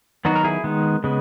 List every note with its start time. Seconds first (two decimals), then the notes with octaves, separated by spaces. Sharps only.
0.25 D#3 F#3 B3 D#4 F#4
0.35 A#4
0.44 E4 G#4
0.64 D#3 G#3 B3
1.04 C#3 G#3 B3